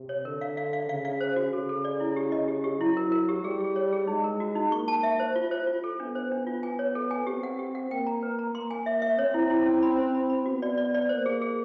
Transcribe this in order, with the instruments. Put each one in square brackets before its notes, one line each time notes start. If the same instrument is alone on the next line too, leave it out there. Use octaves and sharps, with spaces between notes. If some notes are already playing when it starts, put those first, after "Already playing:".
Already playing: [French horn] C3
[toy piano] C#5
[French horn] D3 [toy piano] A#4
[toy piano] F5
F5
F5
[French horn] C#3 [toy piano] F5
[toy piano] F5
C5
F#4
[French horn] C#3 [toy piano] A4
[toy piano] A4
D5
E4
G4
D#5
G4
G4
[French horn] F#3 [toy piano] E4
[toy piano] A#4
A#4
G4
[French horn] G3 [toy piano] G#4
[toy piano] G#4
C#5
G#4
[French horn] G#3 [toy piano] D#4
[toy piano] A#4
F#4
D#4
[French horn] A#3 [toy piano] C#6
[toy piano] A5
E5
C5
F4
C5
F4
A4
[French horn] B3 [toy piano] D4
[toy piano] C5
D4
F4
G#5
C#5
A4
G#5
[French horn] C4 [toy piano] G4
[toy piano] F#5
G4
F#5
[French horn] A#3 [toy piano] G5
[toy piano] A#5
B4
A#5
[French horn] A#3 [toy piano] C6
[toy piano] G#5
E5
E5
[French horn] C4 [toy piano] C#5
[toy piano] E4
E4
C#4
B5
C5
B5
B5
[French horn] B3 [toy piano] F#4
[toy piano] D5
D5
D5
[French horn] A#3 [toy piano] C5
[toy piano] G#4
G#4